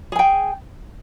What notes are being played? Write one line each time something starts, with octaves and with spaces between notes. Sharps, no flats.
G#4 G5 G#5